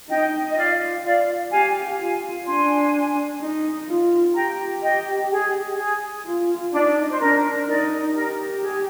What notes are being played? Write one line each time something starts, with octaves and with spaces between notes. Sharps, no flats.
D#4 D#5 G5
D#5
F4 D5 F5
D5 F5
G4 F5 G#5
F4 F5 G#5
D4 G#5 C6
D#4
F4
G4 G5 A#5
D#5 G5
G#4
G#4
F4
D4 D#4
C5
D4 A#4
D#4 A#4 D5
G4 A#4
G#4